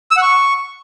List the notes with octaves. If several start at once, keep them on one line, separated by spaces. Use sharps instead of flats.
E6
F#5
C#6